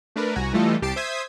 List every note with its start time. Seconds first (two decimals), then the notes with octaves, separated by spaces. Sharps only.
0.16 A3 D4 A#4 B4
0.35 C2 F#4 G#5 A#5
0.53 E3 G3 A3 F4 A4 D#5
0.82 C2 G4 A5 C7 D7
0.96 C5 E5 D#6 G#6 B6